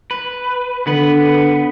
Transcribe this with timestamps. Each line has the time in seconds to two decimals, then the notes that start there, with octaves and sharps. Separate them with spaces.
0.11 B4
0.87 D3 B3 B4